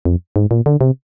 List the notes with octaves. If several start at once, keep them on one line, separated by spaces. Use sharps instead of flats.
F2
G#2
A#2
D3
C3